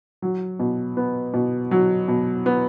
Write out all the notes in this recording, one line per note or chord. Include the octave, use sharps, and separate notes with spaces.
F#3
B2
B3
B2
F#3
B2
B3